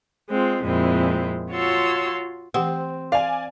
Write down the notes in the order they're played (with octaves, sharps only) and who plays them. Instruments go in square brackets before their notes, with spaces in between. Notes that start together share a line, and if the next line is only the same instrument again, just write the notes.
[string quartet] G#3 C4 F4
F2 A#2 G#3 C4 E4
F4 F#4 C#5 A5 C6 E6
[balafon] E3 G4 F#5 [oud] C4
[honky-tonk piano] D5 G#5 [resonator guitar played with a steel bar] F5